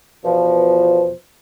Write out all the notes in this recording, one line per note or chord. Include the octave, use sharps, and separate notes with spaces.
E2 B2 F3